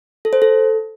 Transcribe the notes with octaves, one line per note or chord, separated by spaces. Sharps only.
A4
C5
A4